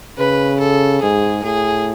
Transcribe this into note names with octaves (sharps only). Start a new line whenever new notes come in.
C#3 B4
A4
G#2 G#4
A2 G#4